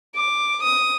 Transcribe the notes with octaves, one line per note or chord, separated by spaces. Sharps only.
D6
D#6